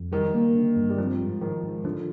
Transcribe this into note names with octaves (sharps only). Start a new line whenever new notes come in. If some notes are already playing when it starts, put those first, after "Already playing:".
Already playing: F2
D#3 G3
A#3
D3
G2
G3
F3 C4
G#2
D#3 F3
G#2
D3 F3